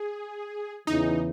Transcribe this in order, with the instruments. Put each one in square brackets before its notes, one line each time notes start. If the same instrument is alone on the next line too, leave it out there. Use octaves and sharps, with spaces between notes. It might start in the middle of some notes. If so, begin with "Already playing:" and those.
Already playing: [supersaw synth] G#4
[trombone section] E2 C#3 E3 [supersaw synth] D#4